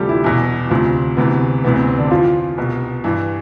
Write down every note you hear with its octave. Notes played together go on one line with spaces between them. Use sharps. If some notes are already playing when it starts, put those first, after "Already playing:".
Already playing: D2 C3 F3 G3 G4 A4
E3 E4
E2 B2 E3 E4
D2 C3 F3
D2 C3 E3 B3
D2 C3 E3 B3
C4
C4
D3 D4
F2 E3 F3 F4
C2 B2
G2 E3